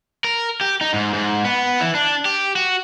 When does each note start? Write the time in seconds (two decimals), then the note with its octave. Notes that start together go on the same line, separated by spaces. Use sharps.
0.24 A#4
0.61 G4
0.81 D#4
0.94 G#2
1.13 G#2
1.45 B3
1.81 E3
1.95 D4
2.25 G4
2.56 F#4